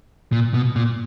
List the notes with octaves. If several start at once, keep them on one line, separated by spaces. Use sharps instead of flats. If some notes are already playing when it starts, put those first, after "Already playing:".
A#2
B2
A#2